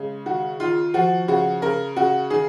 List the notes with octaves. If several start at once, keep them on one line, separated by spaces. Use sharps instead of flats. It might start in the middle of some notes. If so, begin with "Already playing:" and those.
Already playing: C#3 G#3
D#3 F#4
D#3 F4
F3 F#4
C#3 F#4
C#3 A#4
C#3 F#4
D#3 G#4